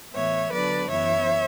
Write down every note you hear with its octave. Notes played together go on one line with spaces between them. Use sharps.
A2 E3 B3 C#5 E5
D3 F#3 B3 D4 B4 D5
F#2 E3 B3 E4 C#5 E5